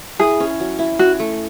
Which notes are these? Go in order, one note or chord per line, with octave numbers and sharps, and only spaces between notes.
E4 G#4
C#4
F#3
E4
C#4 F#4
A3